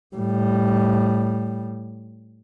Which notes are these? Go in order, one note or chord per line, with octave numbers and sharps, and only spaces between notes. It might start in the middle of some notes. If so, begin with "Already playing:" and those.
A2 G3